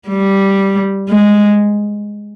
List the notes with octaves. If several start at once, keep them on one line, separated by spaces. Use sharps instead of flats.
G3
G#3